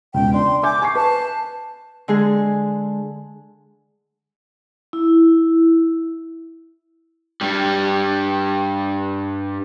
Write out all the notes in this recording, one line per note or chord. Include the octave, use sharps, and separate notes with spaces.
E1 C#2 G5
D4 C6
E5 G#5 D6 G6
G#5 C#6 C7
B4 A5
D3 G#3 G#4
E4
G2 G3